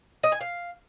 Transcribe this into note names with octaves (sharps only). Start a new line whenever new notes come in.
D#5
G#5
F5